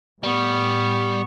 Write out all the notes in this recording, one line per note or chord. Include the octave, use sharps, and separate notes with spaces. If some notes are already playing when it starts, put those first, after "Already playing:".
A2 G3 B3 C#6